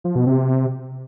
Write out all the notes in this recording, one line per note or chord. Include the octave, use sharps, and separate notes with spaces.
F3
B2
C3